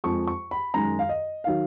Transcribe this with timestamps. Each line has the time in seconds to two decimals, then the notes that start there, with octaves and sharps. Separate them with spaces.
0.04 F2 F3 G#3 C#6
0.27 C#6
0.51 B5
0.74 F#2 D#3 G#3 A#5
0.99 F5
1.09 D#5
1.44 D#3 F#3 F5